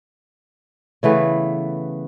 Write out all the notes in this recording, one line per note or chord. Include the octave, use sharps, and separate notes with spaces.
C#3 E3 A3 B3